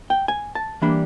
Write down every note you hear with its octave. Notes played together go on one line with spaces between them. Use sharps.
G5
G#5
A5
E3 G3 A#3 D4 B5